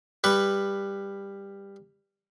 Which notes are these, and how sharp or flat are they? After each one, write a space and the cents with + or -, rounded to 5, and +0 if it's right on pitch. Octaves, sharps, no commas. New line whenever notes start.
G3 +15 B4 +0 C#6 +0